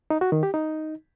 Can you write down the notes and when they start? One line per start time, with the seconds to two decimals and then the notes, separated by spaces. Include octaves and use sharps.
0.10 D#4
0.21 F#4
0.32 D#3
0.43 G4
0.54 D#4